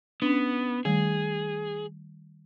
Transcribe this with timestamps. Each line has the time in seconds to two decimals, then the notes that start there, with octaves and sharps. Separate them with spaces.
0.22 B3 C#4 D4
0.85 D#3 G3 A3 G#4